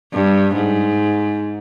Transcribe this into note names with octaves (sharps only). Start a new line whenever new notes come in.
G2
G#2